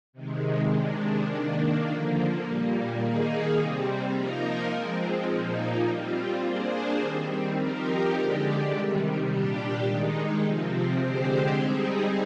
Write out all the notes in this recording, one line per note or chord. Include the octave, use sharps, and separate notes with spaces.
C3 D#3 G#3
C3 D#3 G#3 D4
D#3 A#3 D4
D3 F3 A#3
A#2 G3 A#3
D#3 A#3 D#4 G#4
C3 G3 C4
F3 A#3 D#4 A#4
F3 G#3 C4
A#2 F3 A#3 D#4
G3 C4 F4
A#3 D4 G#4 C5
D#3 G3 C4
F3 C4 D#4 G4 A#4
D3 G#3 D4 G4
C3 D#3 G3
A#2 G3 D4 G4
D#3 G#3 D#4
C3 F3 C4
D3 G#3 C4 G4 C5
G3 C4 D#4 G#4